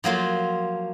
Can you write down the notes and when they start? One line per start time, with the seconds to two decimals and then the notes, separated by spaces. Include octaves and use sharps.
0.04 F3 F#3 A#3 F4